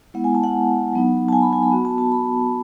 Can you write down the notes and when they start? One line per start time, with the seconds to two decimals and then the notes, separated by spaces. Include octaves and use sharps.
0.14 G#3 B3 E4 F#5
0.24 G#5
0.35 A5
0.43 F#5
0.93 F#3 B3 D#4
1.29 A5
1.33 G#5
1.42 B5
1.53 G#5
1.63 B5
1.72 B3 F#4
1.85 A5
1.98 A5
2.12 B5